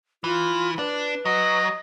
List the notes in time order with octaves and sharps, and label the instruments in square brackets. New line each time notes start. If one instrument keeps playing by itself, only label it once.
[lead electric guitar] E3 [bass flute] F4
[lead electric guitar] D4 [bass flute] B4
[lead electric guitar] F#3 [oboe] D#5